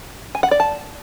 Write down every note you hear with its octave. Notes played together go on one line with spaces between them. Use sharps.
G#5
F#5
D5
A5